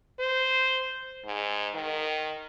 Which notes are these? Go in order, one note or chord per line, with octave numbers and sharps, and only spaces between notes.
C5
G#2
D#3